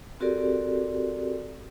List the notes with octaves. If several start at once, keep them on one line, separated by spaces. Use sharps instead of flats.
C4 F#4 G4 A4 A#4 D5